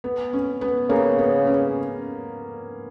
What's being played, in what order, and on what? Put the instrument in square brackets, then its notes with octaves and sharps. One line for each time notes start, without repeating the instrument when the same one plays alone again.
[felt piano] B3
C#4
B3
[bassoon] C#3 [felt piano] A#3
[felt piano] B3
C#4